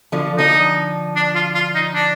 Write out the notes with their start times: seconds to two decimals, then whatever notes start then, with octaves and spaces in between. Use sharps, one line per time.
0.12 D3 F3
0.38 D3 F3 D#4
1.16 D4
1.35 F4
1.55 F4
1.75 D#4
1.94 D4